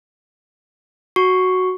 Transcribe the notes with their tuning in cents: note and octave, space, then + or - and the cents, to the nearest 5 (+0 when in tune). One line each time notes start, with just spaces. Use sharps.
F#4 +0 C#6 +0